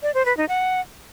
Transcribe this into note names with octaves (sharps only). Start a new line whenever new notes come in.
D5
C5
B4
D#4
F#5